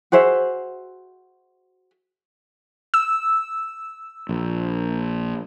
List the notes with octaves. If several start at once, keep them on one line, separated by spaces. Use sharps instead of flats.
F#4 G#4 C5 E5
E6
A#1